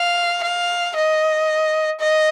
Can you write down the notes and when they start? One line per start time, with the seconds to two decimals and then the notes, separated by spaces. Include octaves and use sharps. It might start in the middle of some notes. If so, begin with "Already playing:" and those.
Already playing: F5
0.43 F5
0.96 D#5
2.00 D#5